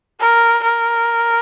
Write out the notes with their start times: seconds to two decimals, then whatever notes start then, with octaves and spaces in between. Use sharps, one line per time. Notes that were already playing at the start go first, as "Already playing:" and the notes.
0.20 A#4
0.63 A#4